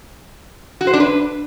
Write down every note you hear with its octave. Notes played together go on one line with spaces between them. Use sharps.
F#4
C5
D4
B4